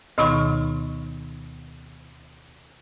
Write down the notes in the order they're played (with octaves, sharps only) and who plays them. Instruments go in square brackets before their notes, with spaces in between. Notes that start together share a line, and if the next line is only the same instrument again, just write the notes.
[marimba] D2 B2 D#3 D#4 B5 C#6